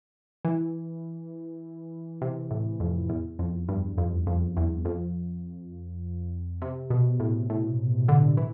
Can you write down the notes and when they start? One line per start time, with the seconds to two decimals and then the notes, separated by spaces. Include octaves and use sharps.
0.45 E3
2.22 C3
2.51 A2
2.80 F2
3.09 E2
3.39 F2
3.69 G2
3.98 F2
4.27 F2
4.57 E2
4.85 F2
6.62 C3
6.90 B2
7.20 A2
7.50 A2
8.08 D3
8.37 E3